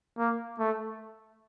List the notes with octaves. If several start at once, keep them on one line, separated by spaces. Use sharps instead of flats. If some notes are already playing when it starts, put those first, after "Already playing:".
A#3
A3